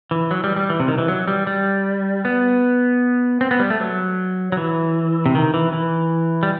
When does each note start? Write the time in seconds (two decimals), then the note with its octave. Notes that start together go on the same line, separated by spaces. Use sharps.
0.11 E3
0.31 F#3
0.44 G3
0.56 G3
0.70 E3
0.80 C3
0.88 D#3
0.98 E3
1.08 F#3
1.28 G3
1.47 G3
2.25 B3
3.41 C4
3.51 B3
3.59 G3
3.70 A3
3.80 F#3
4.52 F#3
4.57 E3
5.26 C3
5.35 D#3
5.54 E3
5.73 E3
6.43 G3